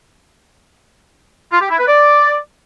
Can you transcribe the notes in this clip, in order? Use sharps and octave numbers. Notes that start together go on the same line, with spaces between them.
F4
G4
E4
B4
D5